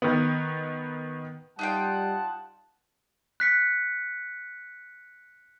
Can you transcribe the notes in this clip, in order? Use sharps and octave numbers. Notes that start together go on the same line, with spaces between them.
D#3 B3
G3 D#4 F4 F#5 G5 A5
F#6 B6 C#7